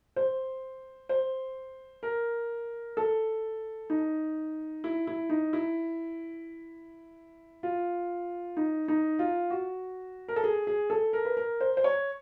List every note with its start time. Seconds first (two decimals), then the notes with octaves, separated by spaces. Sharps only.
0.16 C5
1.09 C5
2.03 A#4
2.97 A4
3.90 D#4
4.84 E4
5.07 E4
5.30 D#4
5.53 E4
7.63 F4
8.57 D#4
8.88 D#4
9.19 F4
9.50 F#4
10.28 A#4
10.36 A4
10.44 G#4
10.67 G#4
10.90 A4
11.13 A#4
11.25 B4
11.37 A#4
11.61 C5
11.77 C5
11.84 C#5